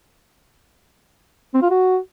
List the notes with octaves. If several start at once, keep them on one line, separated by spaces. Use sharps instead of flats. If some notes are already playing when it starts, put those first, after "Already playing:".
C4
F4
F#4